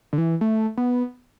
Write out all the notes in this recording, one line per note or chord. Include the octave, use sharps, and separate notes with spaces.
D3
E3
A3
B3